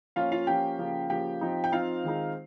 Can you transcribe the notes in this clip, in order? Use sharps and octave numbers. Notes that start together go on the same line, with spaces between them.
F3 A#3 C#4 F4 F5
F4 F5
F3 A#3 C#4 G4 G5
C#3 F3 A#3
C#3 F3 A#3 G4 G5
F3 C4 D#4
G5
F3 C4 D#4 F4 F5
D#3 G#3 C4 D#4